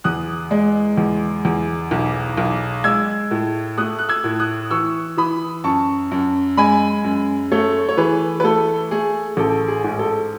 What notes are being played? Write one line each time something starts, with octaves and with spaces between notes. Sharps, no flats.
E2 D#6 F#6
G#3
E2
E2
B1
B1
G#3 E6 G#6
A2
A3 D#6 F#6
F#6
E6 G#6
A2
D#6 F#6
E3 C#6 E6
E3 B5 D#6
F#2 A5 C#6
F#2
G#3 G#5 B5
F#2
A3 A4 C#5
C#5
E3 G#4 B4
B4
A3 A4
A3 G#4
A1 A4
G#4
G#2
A4